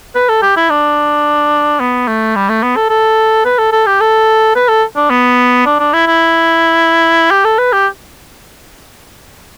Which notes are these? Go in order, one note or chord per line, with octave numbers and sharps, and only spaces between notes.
B4
A4
G4
E4
D4
B3
A3
G3
A3
B3
A4
A4
B4
A4
A4
G4
A4
B4
A4
D4
B3
D4
D4
E4
E4
G4
A4
B4
G4